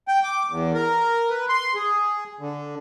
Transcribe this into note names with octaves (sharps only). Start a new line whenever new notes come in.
G5
D6
E2
A#4
B4
C6
G#4
D3